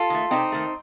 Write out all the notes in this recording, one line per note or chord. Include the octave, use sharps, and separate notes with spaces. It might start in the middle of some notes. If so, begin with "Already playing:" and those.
Already playing: F4 A4
D#3 A3
C3 C4 D#4
D#3 A3